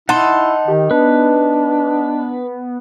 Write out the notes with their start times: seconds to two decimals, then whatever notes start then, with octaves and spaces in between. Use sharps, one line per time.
0.09 D#4 E4 F#5 A5 C6
0.68 D#3 G4
0.91 B3 D4 B4